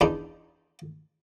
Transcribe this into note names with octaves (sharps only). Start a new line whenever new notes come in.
E2 D4 D#4